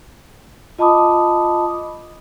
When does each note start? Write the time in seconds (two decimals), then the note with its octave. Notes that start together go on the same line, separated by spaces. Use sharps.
0.79 F4 D#5 A5 B5 D6 D#6